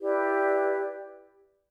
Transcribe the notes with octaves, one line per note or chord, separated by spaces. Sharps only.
E4 G4 B4 D5